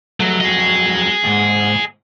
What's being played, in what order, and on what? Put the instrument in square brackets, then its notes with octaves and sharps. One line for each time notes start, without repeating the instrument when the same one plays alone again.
[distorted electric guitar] F#3 [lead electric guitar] G3 A3
[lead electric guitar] F2 F#3 [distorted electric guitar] G#4 D#5
[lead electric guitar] D#2 G#2